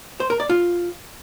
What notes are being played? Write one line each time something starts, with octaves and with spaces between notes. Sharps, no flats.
C5
A#4
D5
F4